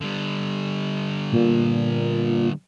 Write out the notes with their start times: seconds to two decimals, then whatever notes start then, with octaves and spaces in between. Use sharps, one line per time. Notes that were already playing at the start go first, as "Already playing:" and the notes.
0.01 D3 G3
1.32 A#2